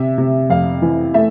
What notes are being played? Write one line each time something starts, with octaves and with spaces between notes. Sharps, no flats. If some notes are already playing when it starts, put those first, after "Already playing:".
Already playing: C3 E5
C3
F2 F5
E3
A3 E5